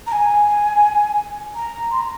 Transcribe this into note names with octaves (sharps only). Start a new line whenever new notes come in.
A#5
G#5
A#5
C6
A#5